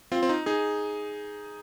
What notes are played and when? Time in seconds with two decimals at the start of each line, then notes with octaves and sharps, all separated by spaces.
0.12 C4 F4
0.23 C4
0.29 D#4
0.46 D#4 G#4